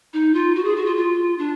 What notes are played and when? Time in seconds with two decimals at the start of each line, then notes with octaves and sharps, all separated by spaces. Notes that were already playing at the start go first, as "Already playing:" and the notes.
0.13 D#4
0.34 F4
0.55 F#4
0.65 G#4
0.76 F#4
0.86 F4
0.97 F4
1.39 D4